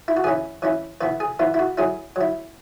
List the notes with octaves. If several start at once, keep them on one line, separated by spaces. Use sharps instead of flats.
E4
F#4
E3 C#4 E4 G#4
E3 C#4 E4
E3 B3 E4 B4
G#4
E3 B3 E4
E4
F#4
F#3 E4 G#4
F#3 E4